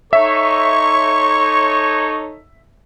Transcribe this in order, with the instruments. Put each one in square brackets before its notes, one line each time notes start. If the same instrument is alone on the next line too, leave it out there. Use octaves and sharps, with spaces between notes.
[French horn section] D#4 A4 C#5 [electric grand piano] E5 [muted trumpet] C#6